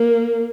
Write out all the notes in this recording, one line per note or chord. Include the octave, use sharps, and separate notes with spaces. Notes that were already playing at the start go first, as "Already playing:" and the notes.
Already playing: A#3